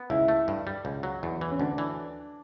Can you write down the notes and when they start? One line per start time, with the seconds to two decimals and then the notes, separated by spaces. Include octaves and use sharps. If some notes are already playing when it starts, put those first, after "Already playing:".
Already playing: B3
0.10 C#2 E4
0.28 A3
0.48 G2
0.67 G3
0.85 C#2
1.03 F#3
1.23 E2
1.41 E3
1.51 C#4
1.59 D2 D4
1.78 E3